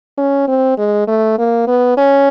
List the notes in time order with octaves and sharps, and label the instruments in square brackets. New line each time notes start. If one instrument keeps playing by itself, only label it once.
[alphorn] C#4
C4
G#3
A3
A#3
B3
C#4